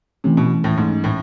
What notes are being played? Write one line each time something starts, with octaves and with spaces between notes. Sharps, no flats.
C3 E3 A3 C#4
B2
A2
G#2 E3 A3 C#4
A2